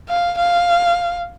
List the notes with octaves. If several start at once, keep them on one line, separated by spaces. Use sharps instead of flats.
F5
F5